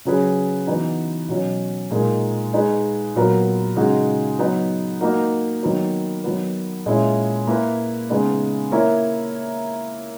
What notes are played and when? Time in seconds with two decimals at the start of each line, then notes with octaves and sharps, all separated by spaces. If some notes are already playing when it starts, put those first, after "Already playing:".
0.05 C#3 F#3 C#4 G#4 B4
0.67 E3 B3 D#4 F#4
1.29 B2 F#3 C#4
1.91 A#2 G#3 D#4 A#4
2.53 G#3 D#4 G#4 B4
3.15 A#2 F#3 B3 F#4 A#4
3.76 C#3 G#3 D#4 F#4
4.39 F#3 B3 D#4
5.01 A#3 D#4 F#4 A#4
5.63 D#3 F#3 B3
6.24 D#3 F#3 B3
6.86 A#2 G#3 C#4 E4
7.47 A#3 E4 B4
8.10 C#3 G#3 B3 D#4
8.72 A#3 E4 A#4 C#5